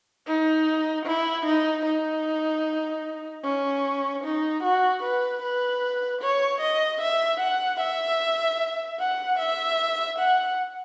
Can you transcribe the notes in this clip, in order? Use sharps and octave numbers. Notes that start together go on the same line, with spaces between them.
D#4
E4
D#4
D#4
C#4
D#4
F#4
B4
B4
C#5
D#5
E5
F#5
E5
F#5
E5
F#5